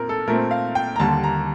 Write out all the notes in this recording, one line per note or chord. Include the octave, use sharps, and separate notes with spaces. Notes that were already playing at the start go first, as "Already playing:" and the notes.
Already playing: A#2 C4 A#4
A4
A#2 A3 C4 A#4
F5
G5
A#5
D#2 D3 G3 A5
A#5